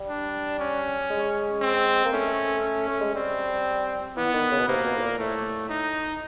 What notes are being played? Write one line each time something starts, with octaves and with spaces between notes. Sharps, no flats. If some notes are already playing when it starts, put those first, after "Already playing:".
Already playing: G3
D4
C#4
G#3
C4
A#3
A3 C#4
C#4
A3
G#3
G3 C4
E3 B3
D#3
C#3
B2
C3 A#3
B2
A2
A#2
A2 A3
D#4